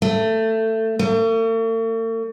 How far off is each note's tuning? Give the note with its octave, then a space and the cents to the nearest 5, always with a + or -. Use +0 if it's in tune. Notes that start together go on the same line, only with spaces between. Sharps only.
A3 +15
A3 +45